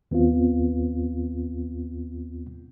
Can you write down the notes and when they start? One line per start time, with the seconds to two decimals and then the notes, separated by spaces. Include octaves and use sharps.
0.11 D#2 B3 C4 F4